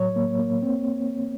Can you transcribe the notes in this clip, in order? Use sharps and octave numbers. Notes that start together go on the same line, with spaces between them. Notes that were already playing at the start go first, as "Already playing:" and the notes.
Already playing: A2 F#3 C#5
A#3
A#3
C4